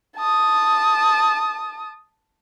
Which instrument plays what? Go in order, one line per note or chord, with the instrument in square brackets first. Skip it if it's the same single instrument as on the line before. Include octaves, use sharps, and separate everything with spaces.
[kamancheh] A5 D#6